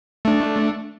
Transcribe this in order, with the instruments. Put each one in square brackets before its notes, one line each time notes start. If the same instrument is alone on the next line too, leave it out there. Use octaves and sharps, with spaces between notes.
[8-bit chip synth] A3 D4